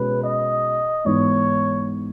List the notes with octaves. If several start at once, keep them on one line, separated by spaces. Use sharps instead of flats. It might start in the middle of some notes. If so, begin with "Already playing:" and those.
Already playing: B2 G#3 C#4 B4
D#5
G#2 E3 B3 D#4 C#5